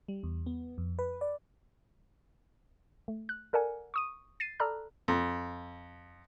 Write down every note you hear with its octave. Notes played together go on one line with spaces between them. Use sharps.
G3
E2
B3
F2
B4
D5
A3
F#6
A4 A#4 D5 F#5 G#5
C#6 D#6 D#7
A6 C7 D#7
A4 D5 A#5 B5 F6 F#6
F2